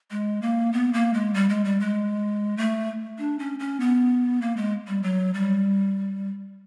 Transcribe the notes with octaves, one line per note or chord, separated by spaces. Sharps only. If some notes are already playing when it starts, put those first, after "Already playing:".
G#3
A#3
B3
A#3
G#3
G3
G#3
G3
G#3
A3
D4
C#4
C#4
B3
A#3
G#3
G3
F#3
G3